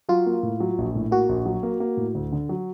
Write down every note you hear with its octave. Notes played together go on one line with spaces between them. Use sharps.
F#3 F4
A#3
A2
F#3
A#1
A2
A#3 F#4
A#1
F#3
A#3
A#3
A2
D2
D3
F#3